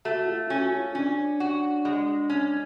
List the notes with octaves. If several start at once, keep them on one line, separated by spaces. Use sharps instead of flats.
A3 F#4
F4
C#4 F#4
F4
C#4 D4
F#4
G#3
C#4